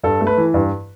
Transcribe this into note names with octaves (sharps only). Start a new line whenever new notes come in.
G2 A4
A3
B4
E3
G2